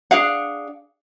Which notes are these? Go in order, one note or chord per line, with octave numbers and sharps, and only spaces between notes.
D4 G#4 F5 F#5